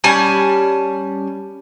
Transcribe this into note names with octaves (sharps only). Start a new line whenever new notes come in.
G3 C#4 G#5 A5